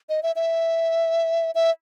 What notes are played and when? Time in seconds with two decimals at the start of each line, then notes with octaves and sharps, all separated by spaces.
0.09 D#5
0.23 E5
0.36 E5
1.55 E5